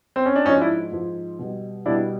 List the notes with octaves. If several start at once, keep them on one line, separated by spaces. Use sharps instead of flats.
C4
C#4
D4
G#2 F3 C#4 D#4
D4 E4
G#2 F3
B2 G3
B2 G3 D4 E4